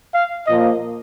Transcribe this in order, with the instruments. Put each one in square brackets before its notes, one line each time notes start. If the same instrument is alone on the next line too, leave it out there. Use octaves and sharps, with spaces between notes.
[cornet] F5
[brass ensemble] A#2 F3 A#3 [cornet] D#5